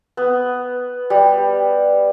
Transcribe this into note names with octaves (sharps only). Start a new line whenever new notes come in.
B3
G3